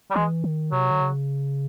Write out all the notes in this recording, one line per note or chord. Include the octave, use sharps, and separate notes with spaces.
G3
E3 G#3
D#3
C3 F#3
D3
C#3